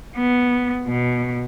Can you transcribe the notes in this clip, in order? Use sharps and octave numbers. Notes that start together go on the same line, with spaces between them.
B3
B2